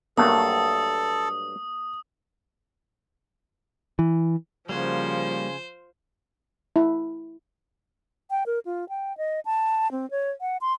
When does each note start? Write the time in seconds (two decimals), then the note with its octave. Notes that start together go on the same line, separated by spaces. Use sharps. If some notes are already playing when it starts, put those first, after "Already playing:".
0.17 G2 F#3 A3 A#3 A4 D#6
3.99 E3
4.69 C#3 F3 G3 A#3 F#4 C5 G#5
6.76 E4
8.30 G5
8.46 A#4
8.65 F4
8.89 G5
9.18 D#5
9.45 A5
9.92 C4
10.11 C#5
10.41 F#5
10.61 C6